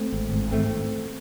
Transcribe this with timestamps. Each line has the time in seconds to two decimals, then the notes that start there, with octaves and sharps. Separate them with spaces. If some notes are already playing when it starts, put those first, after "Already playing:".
Already playing: A3 C4
0.12 G#1
0.32 G#1
0.51 A1 A3 C4